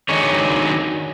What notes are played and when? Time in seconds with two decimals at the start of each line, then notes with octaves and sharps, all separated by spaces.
0.09 D#3 F#3 D4 D#4 G#4 C#5